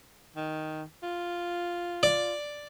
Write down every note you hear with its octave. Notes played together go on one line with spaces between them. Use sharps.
D#3
F4
D5